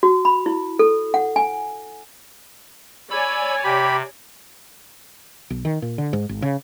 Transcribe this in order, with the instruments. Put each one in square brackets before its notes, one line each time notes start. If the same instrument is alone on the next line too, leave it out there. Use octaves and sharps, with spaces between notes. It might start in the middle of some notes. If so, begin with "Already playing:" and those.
[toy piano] F#4
B5
E4
A4
F#5
G#5
[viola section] C#5 D5 G#5 [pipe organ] B5 E6
[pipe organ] C3 [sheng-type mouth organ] G4 B5
[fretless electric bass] B1
D#3
A#2
D3
G#2
G#1
C#3